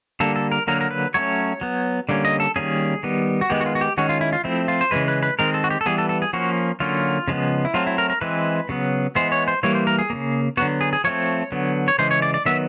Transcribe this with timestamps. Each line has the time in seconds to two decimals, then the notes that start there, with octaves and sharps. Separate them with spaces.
0.20 D3 G3 A#3 A4
0.36 A4
0.52 A#4
0.67 D3 F#3 A#3 A#4
0.81 A#4
0.91 B4
1.14 F#3 A3 C#4 C#5
1.61 F#3 B3
2.09 D3 G3 A#3 C#4
2.25 D#5
2.40 A4
2.56 D#3 G3 A#3 C#4 G#4
3.03 D#3 G3 B3
3.41 F#4
3.50 D#3 G#3 B3 G4
3.61 F#4
3.66 F4
3.75 F#4
3.81 G4
3.97 D#3 G#3 C#4 F#4
4.09 F4
4.21 E4
4.33 F4
4.44 F3 A3 C4 E4
4.68 F4
4.81 C5
4.91 C#3 E3 G#3 B4
5.08 B4
5.23 B4
5.39 D#3 G#3 C4 A#4
5.54 A4
5.64 F#4
5.70 G4
5.81 A4
5.86 E3 G3 B3 G#4
5.98 A4
6.09 A4
6.22 G#4
6.33 F3 A#3 C#4 F#4
6.80 D3 F#3 A#3 C#4 F4
7.28 C#3 F3 G#3 B3
7.65 E4
7.74 F#3 A3 C4 F4
7.87 E4
7.98 A#4
8.10 A#4
8.21 E3 G#3 C4 B4
8.69 C#3 F#3 B3
9.15 E3 G#3 B3 C5
9.32 C#5
9.48 C5
9.63 E3 G3 A#3 C#5
9.75 C5
9.87 A#4
9.99 G#4
10.10 C#3 F3 A#3
10.57 D3 F#3 B3 F#4
10.81 G#4
10.93 G#4
11.04 F3 A3 C4 C#5
11.52 D3 F#3 B3
11.88 C#5
11.99 C#3 E3 G#3 C5
12.11 C#5
12.22 D5
12.34 D5
12.46 D#3 F#3 B3 E5